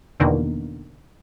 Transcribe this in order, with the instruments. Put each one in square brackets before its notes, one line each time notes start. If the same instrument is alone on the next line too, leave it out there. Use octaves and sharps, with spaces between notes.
[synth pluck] E2 B2 D3 D#3 A#3